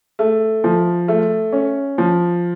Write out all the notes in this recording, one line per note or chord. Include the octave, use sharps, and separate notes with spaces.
A3
F3
A3
C#4
F3